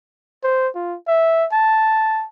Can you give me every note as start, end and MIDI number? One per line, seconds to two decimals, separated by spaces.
0.43 0.69 72
0.75 0.96 65
1.07 1.46 76
1.52 2.25 81